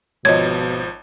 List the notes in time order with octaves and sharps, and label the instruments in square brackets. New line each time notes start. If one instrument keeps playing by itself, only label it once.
[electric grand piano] G#1 F3 [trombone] B2 [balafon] C#5 D#5 [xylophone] G#6